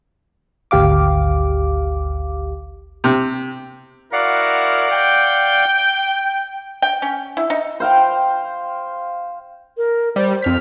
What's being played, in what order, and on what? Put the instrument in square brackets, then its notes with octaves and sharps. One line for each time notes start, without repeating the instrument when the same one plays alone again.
[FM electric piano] G#1 D2 G4 F5 D6
[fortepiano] C3
[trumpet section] E4 F#4 A#4 [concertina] D5 F5 F#5
[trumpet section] G5
[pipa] G5
C#4
E4
D#4
[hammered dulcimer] C5 F5 G5
[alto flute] A#4
[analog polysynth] G3 [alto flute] C5
[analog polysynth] F2 F6 B6